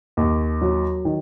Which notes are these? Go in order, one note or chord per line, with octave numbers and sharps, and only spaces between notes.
D#2
F#3
D#3